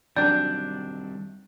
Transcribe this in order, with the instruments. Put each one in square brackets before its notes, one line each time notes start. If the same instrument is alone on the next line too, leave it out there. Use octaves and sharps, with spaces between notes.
[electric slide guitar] D#3 G3 C4 [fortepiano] F#3 D4 G5 [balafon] D5 [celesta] G6